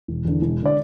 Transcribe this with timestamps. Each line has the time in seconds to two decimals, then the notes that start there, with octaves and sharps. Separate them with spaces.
0.08 E1
0.25 E2 D3
0.42 E1
0.62 D3 D5